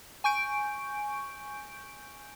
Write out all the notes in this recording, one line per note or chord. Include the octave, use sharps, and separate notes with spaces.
G#5 C#6 G6 D7